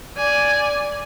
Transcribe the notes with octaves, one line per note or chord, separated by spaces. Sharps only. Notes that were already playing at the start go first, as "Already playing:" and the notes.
D5 G#5